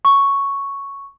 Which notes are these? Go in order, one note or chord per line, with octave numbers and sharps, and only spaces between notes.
C#6